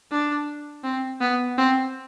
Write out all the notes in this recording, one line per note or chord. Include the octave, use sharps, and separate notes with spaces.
D4
C4
B3
C4